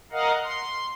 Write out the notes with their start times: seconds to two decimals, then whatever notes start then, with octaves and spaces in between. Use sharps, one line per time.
0.12 A#4 D#5 F5 F#5
0.43 C6